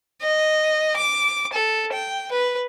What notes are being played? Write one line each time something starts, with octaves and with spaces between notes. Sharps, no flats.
D#5
D6
A4
G5
B4